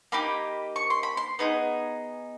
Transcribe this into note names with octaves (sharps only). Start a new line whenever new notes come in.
A#3 D#4 G4 B5
C#6
C6
B5
C6
B3 D#4 G#4